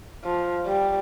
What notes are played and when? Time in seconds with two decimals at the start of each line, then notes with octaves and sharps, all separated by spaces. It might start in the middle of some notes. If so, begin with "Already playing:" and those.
0.24 F3
0.67 G3